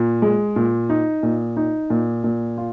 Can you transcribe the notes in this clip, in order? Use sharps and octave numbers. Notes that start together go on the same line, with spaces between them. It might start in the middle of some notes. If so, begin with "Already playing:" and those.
Already playing: A#2
G#3
A#2
D#4
A#2
D#4
A#2
A#2
F4